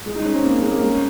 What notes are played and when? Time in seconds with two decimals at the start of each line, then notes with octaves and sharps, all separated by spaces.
0.06 G#3
0.15 D#4
0.25 C#4
0.34 C4
0.44 A#3
0.54 C#4
0.63 G#3
0.71 A#3
0.81 C#4